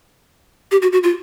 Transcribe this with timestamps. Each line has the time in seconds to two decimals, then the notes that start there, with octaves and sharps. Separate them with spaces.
0.72 G4
0.82 F#4
0.93 F#4
1.03 F4